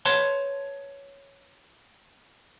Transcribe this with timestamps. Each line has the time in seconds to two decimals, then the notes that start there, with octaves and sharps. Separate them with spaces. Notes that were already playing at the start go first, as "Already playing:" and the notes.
0.05 B4 C#5 A5 C6